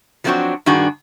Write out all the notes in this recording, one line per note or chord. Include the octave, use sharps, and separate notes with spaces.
F3 F#3 A3 C4 D4 F#4
G2 D#3 D4 F#4 G#4